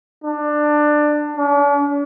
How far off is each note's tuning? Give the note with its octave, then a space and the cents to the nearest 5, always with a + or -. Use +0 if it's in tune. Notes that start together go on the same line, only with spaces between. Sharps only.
D4 +20
D4 -45